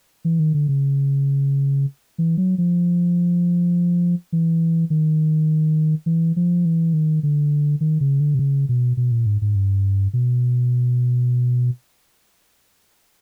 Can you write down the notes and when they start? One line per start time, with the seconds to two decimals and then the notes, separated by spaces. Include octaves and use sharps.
0.25 E3
0.39 D#3
0.54 D3
0.68 C#3
2.18 E3
2.38 F#3
2.58 F3
4.32 E3
4.90 D#3
6.06 E3
6.36 F3
6.65 E3
6.93 D#3
7.23 D3
7.81 D#3
8.00 C#3
8.20 D3
8.35 C3
8.39 C#3
8.69 B2
8.97 B2
9.12 A#2
9.26 G#2
9.42 G#2
9.56 G2
10.13 B2